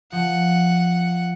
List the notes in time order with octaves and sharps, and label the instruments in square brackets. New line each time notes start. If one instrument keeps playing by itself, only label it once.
[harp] F3 [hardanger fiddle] F#5